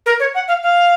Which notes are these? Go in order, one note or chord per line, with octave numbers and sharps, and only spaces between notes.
A#4
C#5
F#5
F5
F5